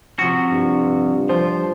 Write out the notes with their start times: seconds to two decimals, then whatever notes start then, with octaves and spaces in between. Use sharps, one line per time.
0.19 C3 F3 F#4
0.51 G2
1.29 F3 C5